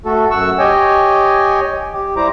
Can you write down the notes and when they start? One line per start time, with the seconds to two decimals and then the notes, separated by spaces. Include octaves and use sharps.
0.05 A3 F#4 A4
0.31 F#2 F#5 C#6 E6
0.59 G4 C#5 D#5 G5 G#5
1.93 G4
2.16 G3 E4 C5 A#5 D6